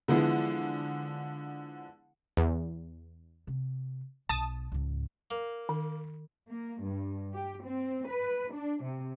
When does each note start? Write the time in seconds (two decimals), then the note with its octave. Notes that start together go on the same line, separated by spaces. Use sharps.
0.08 D3 E3 F3 G#3 B3 E4
2.37 E2
3.47 C3
4.29 B1 A5 D#6 A6
4.72 C#2 G#2
5.31 A#3
5.69 D#3
6.50 A#3
6.82 G2
7.34 G4
7.65 C4
8.09 B4
8.54 D4
8.84 C3